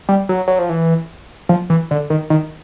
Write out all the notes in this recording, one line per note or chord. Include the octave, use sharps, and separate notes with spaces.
G3
F#3
F#3
F3
E3
F3
E3
D3
D#3
D#3